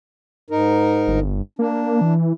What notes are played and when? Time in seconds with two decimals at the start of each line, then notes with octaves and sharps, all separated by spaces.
0.50 G#2 D#4 A#4
1.08 G1
1.59 A#3 D4
2.01 E3